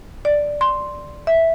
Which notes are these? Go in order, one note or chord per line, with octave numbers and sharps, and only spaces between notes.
D5
C6
E5